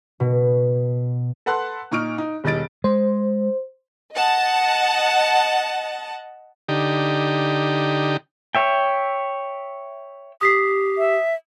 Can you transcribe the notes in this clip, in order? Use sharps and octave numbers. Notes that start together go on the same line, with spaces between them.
B2
A4 B4 F#5 A5 C6 F#6
A#2 D#4 C#6 F6 D7
D#4
E1 D#3 G3 D#5 A6 D7
G#3 C5
D#5 F#5 A5
D3 D#4 G4
C#5 E5 G5
G4 D#6 B6 C7
E5